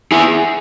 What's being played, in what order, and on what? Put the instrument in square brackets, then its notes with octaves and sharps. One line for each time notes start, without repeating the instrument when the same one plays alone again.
[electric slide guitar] E4 G#4